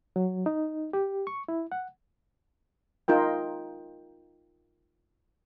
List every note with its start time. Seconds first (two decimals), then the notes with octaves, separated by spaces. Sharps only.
0.16 F#3
0.46 D#4
0.93 G4
1.27 C#6
1.48 E4
1.72 F#5
3.08 D#4 F4 A#4 G5